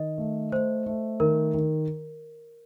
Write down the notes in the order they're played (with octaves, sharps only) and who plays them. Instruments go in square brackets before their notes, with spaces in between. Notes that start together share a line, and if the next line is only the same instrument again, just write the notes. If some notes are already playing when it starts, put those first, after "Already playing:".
Already playing: [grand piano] D#3 [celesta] D#5
[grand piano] A3
[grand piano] A3 [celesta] C5
[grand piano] A3
[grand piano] D#3 [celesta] A#4
[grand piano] D#3